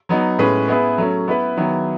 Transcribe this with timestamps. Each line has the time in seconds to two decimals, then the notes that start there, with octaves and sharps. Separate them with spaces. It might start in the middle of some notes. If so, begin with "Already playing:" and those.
0.09 F#3 B3 D#4
0.39 A2 G#3 C#4 G#4 B4
0.68 B3 E4 G#4 B4
0.98 F#3 A3 C#4
1.28 B3 E4 B4
1.57 D#3 F#3 B3 E4